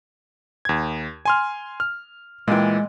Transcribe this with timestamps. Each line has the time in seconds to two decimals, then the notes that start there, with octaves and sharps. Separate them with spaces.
0.65 D#2 G#6
1.25 G#5 C6 F6
1.80 F6
2.48 A#2 E3 G#3 G5